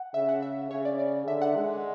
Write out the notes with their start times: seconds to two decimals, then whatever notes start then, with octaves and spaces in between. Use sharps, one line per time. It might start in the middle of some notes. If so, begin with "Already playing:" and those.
Already playing: F#5
0.14 C#3 E5
0.29 F#5
0.42 E5
0.71 C#3 C#5
0.85 D5
0.99 D5
1.27 D3 E5
1.42 F#5
1.56 G#3